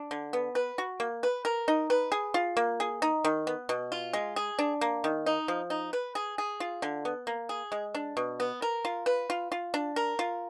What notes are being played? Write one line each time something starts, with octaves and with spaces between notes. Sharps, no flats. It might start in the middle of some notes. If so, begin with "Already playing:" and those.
Already playing: D4
D3
B3
B4
F#4
A#3
B4
A#4
D#4
B4
G#4
F4
A#3
G#4
D#4
D#3
B3
B2
F4
G#3
G#4
D4
A#3
D#3
D#4
F3
D#4
B4
G#4
G#4
F4
D3
B3
A#3
G#4
G#3
D4
B2
B3
A#4
F4
B4
F4
F4
D4
A#4
F4